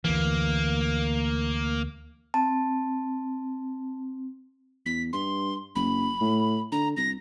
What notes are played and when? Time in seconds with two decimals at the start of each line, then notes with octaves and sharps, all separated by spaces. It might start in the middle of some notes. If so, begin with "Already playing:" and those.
0.05 D2 E3 A#3
2.34 C4 A5
4.86 E2 B6
5.13 G2 C6
5.75 F#1 B5
6.21 A2
6.72 D3 A#5
6.97 C2 A#6